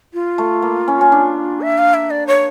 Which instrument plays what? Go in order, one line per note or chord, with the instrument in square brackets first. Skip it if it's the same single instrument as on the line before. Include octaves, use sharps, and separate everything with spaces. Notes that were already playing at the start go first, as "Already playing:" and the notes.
[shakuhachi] F4
[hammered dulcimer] A3
A#3
C#4
C#4
D4
[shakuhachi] E5
F5
E5
D5
C#5